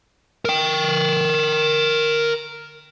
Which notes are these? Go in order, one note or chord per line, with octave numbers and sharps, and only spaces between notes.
A#4 G5